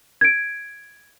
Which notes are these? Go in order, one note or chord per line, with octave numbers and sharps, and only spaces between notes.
G#6 D7